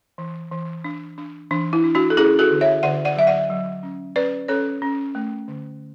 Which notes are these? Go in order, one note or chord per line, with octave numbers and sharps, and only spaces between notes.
E3
E3
D4
D4
E3 D4
E4
D4
D4 F#4
A4
C#4 E4 G#4
F#4 A4
D3
C#5 E5
D3 D5 F#5
D5 F#5
F#3 E5
D5 F#5
F#3
C#4
C#4 B4 D5
C#4 A4 C#5
C#4
A3
D3